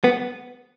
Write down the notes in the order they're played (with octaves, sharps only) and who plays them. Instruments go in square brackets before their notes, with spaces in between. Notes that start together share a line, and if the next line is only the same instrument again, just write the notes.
[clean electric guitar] B3